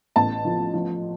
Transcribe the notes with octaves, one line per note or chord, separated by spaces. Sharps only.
A1 A5
F3
F3